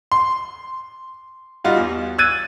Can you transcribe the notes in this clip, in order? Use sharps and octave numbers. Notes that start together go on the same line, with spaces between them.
C6
G3 D#4 F4 F#4
E2
E6 F#6 G#6 A6 D#7